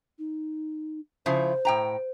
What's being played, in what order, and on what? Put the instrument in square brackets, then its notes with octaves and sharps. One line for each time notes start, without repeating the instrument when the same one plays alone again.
[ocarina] D#4
[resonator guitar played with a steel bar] C#3 F3 E4 [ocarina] C5
[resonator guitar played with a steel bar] A2 G5 A#5